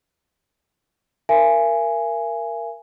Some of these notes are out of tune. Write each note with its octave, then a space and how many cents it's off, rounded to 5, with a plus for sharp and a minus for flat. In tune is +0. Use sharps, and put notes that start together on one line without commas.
A#4 +0 E5 +40 G#5 +0